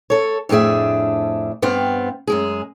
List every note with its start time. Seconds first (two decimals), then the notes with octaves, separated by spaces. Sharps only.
0.10 A4 C#5
0.49 F2 A2 D4 G#4 E5
1.62 G2 B3 C4 F5
2.27 F#2 G#3 G#4